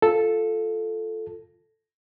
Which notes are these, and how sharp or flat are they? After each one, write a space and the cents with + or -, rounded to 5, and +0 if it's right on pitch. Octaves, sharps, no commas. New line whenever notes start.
F4 +0 A4 +0